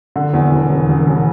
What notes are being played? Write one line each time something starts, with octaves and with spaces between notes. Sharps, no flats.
D3
E2
E1
E1
E1
E1